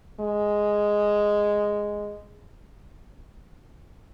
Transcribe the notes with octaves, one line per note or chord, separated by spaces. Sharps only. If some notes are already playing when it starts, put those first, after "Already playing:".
G#3